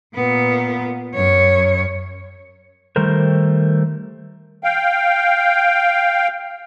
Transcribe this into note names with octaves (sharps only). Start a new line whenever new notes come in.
A#2 B3
F#2 C#5
D#3 G3 A3 A#4 C5
F5 G5